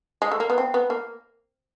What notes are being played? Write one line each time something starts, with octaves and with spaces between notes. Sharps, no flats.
G#3
A3
A#3
B3
C4
B3
A#3